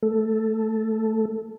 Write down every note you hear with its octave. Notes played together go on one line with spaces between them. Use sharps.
A3 A4